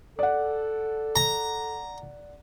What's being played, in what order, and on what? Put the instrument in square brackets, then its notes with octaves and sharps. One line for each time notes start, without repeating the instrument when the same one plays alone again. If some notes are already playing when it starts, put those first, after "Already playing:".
[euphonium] A4 [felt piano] D5 F#5
[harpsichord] A#5